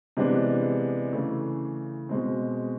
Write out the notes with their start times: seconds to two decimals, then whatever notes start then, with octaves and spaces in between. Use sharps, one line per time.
0.17 C3 E3 G#3 B3 D4
1.13 C#3 E3 A3
2.09 B2 G#3 C4